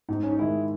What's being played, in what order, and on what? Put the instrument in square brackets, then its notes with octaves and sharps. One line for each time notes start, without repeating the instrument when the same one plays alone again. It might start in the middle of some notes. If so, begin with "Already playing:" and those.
[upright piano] G#2 [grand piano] D#4
[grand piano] C#4
D#4
[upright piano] D#3 G#3 [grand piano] E4